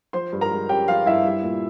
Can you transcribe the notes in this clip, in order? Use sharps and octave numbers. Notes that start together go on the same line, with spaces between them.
F3 C5 C6
G2
A#4 A#5
G#3
C#4 G4 G5
F3 F4 F5
G2 E4 E5
G3
A#2